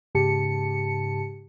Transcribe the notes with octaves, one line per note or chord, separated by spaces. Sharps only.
G#2 C#3 G4 A5 C#7